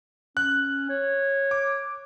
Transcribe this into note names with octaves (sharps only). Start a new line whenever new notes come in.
C#4 F#6
C#5
D6